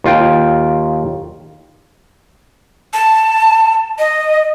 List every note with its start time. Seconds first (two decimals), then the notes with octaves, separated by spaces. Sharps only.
0.04 D#2 F4 G5
2.94 A5
3.99 D#5